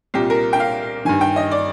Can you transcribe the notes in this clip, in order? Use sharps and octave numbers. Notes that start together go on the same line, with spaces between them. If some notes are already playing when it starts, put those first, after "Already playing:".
C2 A#2 G4
A#4
G5
F5
G2 D#3 G#5
G5
D#5
D5